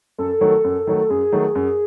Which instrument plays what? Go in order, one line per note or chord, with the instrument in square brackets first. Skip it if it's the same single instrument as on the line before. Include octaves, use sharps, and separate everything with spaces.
[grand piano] F#2 [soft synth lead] A4
[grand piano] D#3 F#3 A3
F#2
D#3 F#3 A3
[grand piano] F#2 [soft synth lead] G#4
[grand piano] D#3 F#3 A3
F#2